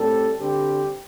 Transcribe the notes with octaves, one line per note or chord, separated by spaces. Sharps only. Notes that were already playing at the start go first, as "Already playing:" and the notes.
Already playing: A2 G3 C4 A4
D3 G3 C4 G4